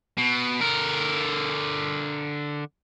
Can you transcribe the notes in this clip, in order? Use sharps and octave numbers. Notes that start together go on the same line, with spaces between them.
B2
D3 A#4